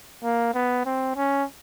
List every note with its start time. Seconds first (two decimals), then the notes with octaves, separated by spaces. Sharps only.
0.23 A#3
0.54 B3
0.86 C4
1.16 C#4